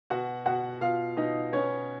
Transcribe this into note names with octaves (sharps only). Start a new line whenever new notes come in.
B2 F#4 F#5
B2 F#4 F#5
B2 F4 F5
B2 D#4 D#5
B3 C#4 C#5